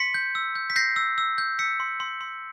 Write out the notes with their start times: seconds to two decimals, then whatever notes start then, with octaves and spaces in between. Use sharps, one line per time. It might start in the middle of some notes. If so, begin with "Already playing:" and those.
Already playing: C6 B6 C#7
0.14 G6
0.35 E6
0.55 G6
0.70 B6
0.76 G6 A#6 C7
0.96 E6
1.18 E6
1.38 G6
1.59 E6 B6 C#7
1.80 C6
2.00 C6
2.21 C6